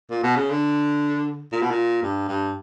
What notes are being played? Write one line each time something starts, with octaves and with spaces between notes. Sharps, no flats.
A#2
B2
C#3
D3
A#2
B2
A#2
G2
G2